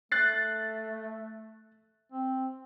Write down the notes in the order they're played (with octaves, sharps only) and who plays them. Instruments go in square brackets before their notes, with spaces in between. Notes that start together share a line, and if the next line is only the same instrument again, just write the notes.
[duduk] A3 [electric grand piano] F#6 A6 C7
[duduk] C4